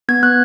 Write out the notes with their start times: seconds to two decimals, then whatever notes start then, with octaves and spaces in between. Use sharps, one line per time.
0.09 B3 G#6
0.23 B3 F#6